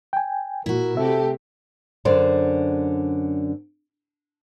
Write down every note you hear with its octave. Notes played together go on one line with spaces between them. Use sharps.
G5 G#5
A#2 E4 F#4 A#4
C3 A3 G4 A4 E5
F#2 D3 C5 D5